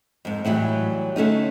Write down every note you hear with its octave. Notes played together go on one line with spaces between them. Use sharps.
F2 G#2
A2 E3 F#3 G3
D3 A3 C#4 D#4